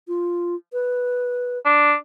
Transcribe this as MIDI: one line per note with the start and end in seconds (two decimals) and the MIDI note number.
0.08 0.55 65
0.73 1.58 71
1.65 1.94 62